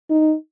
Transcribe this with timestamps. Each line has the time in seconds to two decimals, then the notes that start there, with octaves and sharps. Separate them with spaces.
0.10 D#4